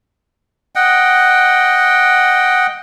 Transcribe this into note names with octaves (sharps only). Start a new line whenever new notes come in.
D#5 F#5 G5